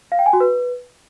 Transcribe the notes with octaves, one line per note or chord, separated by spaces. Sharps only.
F5
G5
G#5
F#4
B4